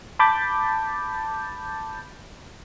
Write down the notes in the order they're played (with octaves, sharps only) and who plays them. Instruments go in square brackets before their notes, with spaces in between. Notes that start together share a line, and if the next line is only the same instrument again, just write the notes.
[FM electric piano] A5 B5 D6 G6 A6